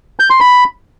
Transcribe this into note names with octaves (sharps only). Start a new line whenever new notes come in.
G6
C6
B5